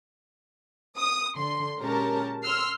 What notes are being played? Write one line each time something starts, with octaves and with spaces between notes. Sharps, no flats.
D#6
D3 C6
A#2 G#3 C#4 G4 A#4 A5
C6 E6 F6 C7